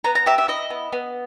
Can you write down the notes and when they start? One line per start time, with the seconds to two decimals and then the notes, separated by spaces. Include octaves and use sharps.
0.04 B3 A#5
0.15 A#5
0.26 G4 E5
0.38 E5
0.48 E4 D#5
0.70 B3
0.93 B3